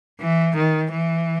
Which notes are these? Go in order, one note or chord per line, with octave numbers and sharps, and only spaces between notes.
E3
D#3
E3